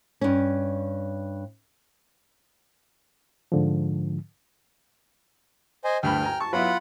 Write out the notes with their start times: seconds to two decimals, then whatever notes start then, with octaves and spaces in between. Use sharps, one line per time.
0.21 G2 C#4
3.52 G#2 D3 F3
5.84 C5 D#5 G#5
6.03 D2 G2 G5 B5 F6
6.23 G#5 A#5
6.40 A5 C#6
6.53 F#3 B3 E4 F4 F#5 B5